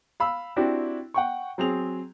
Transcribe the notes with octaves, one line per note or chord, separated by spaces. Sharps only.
F5 B5 E6
C4 D4 E4 F#4 G4
F#5 G5 C#6
F#3 C4 G#4 F7